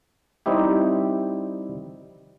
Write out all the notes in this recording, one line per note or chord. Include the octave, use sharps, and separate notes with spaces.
G3 C4 D#4 E4 G4